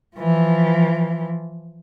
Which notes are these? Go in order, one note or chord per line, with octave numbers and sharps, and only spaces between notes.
E3 F3